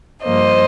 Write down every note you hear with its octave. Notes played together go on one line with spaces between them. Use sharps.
G2 F3 A#3 C5 D#5